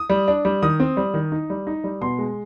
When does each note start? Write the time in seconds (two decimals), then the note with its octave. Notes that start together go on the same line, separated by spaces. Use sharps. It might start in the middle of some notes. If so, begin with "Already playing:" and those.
Already playing: D#6
0.10 G3
0.28 D4
0.45 G3
0.62 D#3 D#6
0.80 C4
0.97 G3
1.14 D#3
1.32 D#4
1.50 G3
1.67 D#4
1.84 G3
2.01 B2 C6
2.19 G#3